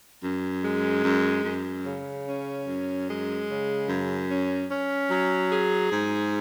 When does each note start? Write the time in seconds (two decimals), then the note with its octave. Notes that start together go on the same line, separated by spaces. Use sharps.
0.23 F#2
0.63 G#3
1.04 F#2
1.44 F#2
1.85 C#3
2.26 C#4
2.66 F#2
3.07 G#3
3.48 C#3
3.88 F#2
4.29 C#4
4.70 C#4
5.11 F#3
5.51 G#4
5.92 G#2